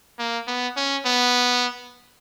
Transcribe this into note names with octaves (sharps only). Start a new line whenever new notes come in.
A#3
B3
C#4
B3